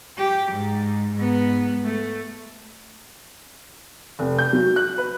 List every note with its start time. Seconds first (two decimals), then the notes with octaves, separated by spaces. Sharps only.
0.18 G4
0.52 G#2
1.16 G#2 B3
1.84 A3
4.19 F1
4.39 G6
4.53 F#3
4.76 F#6
4.98 B4